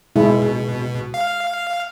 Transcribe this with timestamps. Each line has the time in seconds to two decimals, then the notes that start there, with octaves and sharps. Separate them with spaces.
0.16 B2 G#3 E4
1.14 F5